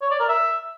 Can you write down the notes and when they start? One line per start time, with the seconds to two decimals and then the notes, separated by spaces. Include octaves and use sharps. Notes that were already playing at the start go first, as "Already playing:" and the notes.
0.02 C#5
0.11 D5
0.20 A#4
0.29 E5